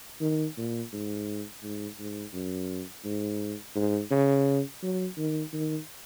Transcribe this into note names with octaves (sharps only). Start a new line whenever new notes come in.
D#3
A#2
G#2
G#2
G#2
F#2
G#2
G#2
C#3
F#3
D#3
D#3